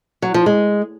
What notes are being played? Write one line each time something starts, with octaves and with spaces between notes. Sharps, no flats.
F#3
F3
G#3